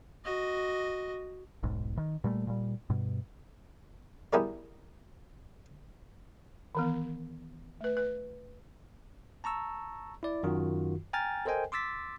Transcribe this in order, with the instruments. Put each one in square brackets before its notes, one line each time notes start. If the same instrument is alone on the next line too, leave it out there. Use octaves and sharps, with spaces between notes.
[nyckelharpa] F#4 D#5
[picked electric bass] D#1 B1 G#2
D#3
A#2 G3 A3
A#2 G3
G2 B2
[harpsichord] G3 B3 E4 G#4 A#4 D5
[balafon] D#3 E3 B3
A3 B4
B4
[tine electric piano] A5 A#5 C#6 E6
E4 D5
F#2 D#3 F4 F#4
G5 G#5 A#5 F6 A6
A4 A#4 C5 D#5 G5 G#5
C6 D6 E6 A6 B6